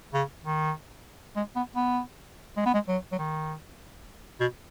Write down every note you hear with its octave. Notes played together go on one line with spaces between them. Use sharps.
C#3
D#3
G#3
B3
B3
G#3
B3
G#3
F#3
F#3
D#3
B2